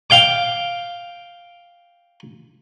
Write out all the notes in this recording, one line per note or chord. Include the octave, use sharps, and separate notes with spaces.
F5 G5 D6